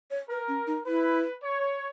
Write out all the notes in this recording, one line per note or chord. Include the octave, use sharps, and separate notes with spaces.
C#5
A#4 B4
C#4
D#4
E4 B4
C#5